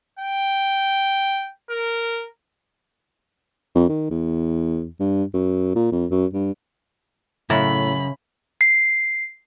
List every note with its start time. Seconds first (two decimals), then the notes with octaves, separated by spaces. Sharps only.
0.19 G5
1.70 A#4
3.75 F2
3.89 D#3
4.10 E2
5.00 G2
5.34 F#2
5.76 A#2
5.92 F2
6.11 F#2
6.34 G2
7.50 F#2 A2 C#3 B5
8.61 C7